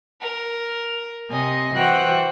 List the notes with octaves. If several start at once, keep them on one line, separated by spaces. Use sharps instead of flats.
A#4
C3 D#5 G#5
E3 F#4 C5 G5 F#6